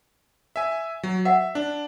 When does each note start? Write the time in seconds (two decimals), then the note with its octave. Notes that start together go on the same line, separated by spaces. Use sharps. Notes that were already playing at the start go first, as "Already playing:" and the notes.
0.56 E5 G#5
1.03 F#3
1.25 E5 F#5
1.55 D4